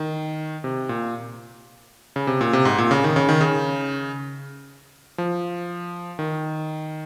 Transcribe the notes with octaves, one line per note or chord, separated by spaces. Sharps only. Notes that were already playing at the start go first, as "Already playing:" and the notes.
Already playing: D#3
C3
A#2
C#3
C3
A#2
C3
G#2
A#2
C#3
D#3
C#3
D#3
C#3
F3
D#3